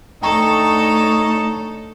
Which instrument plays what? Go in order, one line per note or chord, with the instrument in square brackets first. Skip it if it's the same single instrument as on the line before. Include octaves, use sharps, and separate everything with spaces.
[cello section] D2 C#5 [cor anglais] D#4 [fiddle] A4 A5 [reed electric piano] G5 A#5 C#6